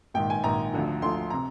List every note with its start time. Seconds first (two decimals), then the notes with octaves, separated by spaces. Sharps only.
0.14 A#1 G#2 D#3 G5
0.30 G#5
0.43 A#1 G#2 D#3 A#5
0.73 D2 D3 F3
1.02 D2 D3 F3 C6
1.30 C3 A#5